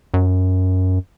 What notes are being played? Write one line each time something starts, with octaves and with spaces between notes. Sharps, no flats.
F#2